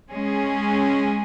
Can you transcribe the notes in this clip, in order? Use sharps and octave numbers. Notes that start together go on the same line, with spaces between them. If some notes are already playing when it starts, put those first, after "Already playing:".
G#3 C#4 G#4